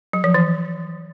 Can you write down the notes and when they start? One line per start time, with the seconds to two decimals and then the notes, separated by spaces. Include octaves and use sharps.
0.13 F#3
0.24 F3
0.34 E3